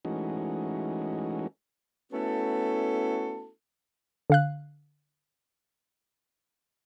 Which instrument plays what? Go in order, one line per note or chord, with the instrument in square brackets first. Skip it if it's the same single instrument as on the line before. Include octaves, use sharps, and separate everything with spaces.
[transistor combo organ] E3 G#3 A3 C#4 D#4 F#4
[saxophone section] A3 B3 C#4 E4 F#4 A4
[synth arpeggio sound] D3 F5 F#6